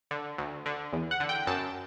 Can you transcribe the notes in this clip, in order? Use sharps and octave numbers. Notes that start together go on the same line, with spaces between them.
D3
D2
D3
E2
F#5
D3
G5
F#2 A5